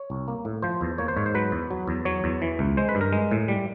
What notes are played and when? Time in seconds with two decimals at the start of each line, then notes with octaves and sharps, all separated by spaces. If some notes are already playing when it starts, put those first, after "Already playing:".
Already playing: C#5
0.10 C2
0.28 A#3
0.45 A2
0.62 F3 C5
0.81 E2
0.98 A#3 C#5
1.08 C5
1.17 G#2 C#5
1.26 C5
1.34 F#3 B4
1.52 E2
1.71 F#3
1.88 E2
2.05 F#3 C#5
2.24 E2
2.42 E3
2.59 C#2
2.77 G#3 C5
2.89 B4
2.95 G2
3.01 A#4
3.13 G#3
3.31 A2
3.48 G3